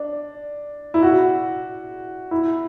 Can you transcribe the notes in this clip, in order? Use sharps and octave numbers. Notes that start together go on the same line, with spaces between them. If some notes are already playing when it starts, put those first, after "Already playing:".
Already playing: D4
E4
F#4
E4